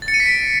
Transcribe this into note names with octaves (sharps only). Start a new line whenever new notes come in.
A6
C#7
D#7
B6
D7